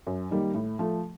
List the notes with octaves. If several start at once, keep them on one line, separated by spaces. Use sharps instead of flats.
F#2
D#3 G3 A#3
A2
F3 A3